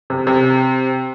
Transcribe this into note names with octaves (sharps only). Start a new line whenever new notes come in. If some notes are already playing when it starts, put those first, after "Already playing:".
C3
C3